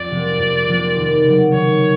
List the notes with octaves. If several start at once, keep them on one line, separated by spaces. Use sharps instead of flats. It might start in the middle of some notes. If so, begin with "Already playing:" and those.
Already playing: F2 D5
C3 F3 A#3
F2
C3 F3 A#3
D#2
C#3 F#3
D#2 C#5